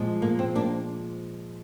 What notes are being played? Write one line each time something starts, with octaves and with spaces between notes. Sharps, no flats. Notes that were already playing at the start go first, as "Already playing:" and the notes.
Already playing: A#2 F3 G#3
A#3
C4
A#3 D4